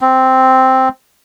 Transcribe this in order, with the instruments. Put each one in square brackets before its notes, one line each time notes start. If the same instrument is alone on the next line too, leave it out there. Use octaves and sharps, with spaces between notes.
[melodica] C4